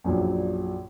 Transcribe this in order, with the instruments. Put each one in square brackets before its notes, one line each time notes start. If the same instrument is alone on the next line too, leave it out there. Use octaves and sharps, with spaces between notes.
[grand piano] A#1 F#2 A#2